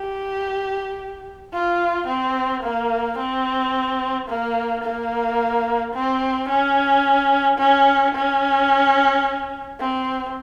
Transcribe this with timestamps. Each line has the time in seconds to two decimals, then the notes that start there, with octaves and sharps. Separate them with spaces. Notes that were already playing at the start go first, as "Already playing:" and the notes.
Already playing: G4
1.53 F4
2.07 C4
2.63 A#3
3.18 C4
4.28 A#3
4.84 A#3
5.94 C4
6.49 C#4
7.58 C#4
8.15 C#4
9.79 C4